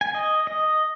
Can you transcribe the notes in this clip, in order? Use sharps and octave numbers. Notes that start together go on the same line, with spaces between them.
G#5
D#5
D#5